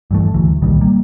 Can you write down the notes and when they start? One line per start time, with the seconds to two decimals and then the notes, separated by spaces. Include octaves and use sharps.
0.11 G2 E3 A3
0.34 D2 E3 F#3
0.62 C2 A#2 D#3 G3
0.81 G3 A#3